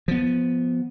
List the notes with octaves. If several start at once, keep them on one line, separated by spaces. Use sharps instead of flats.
F3 B3